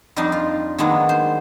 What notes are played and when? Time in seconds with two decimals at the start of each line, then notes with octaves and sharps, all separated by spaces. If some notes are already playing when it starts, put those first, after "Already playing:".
0.16 F2 G3 D4 D#4 D5 C6
0.32 F4
0.78 D#3 F#3 G#3 A#3 B3 D4
1.09 C5